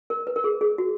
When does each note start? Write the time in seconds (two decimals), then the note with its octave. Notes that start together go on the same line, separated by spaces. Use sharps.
0.10 A#4
0.27 B4
0.36 A#4
0.44 G#4
0.61 G#4
0.78 F#4